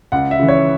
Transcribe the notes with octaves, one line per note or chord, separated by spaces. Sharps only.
C#2 F#5
E5
C#3 E3
C#5